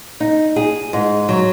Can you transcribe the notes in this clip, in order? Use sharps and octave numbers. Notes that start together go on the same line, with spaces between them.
D#4
G#4
G#2
F#3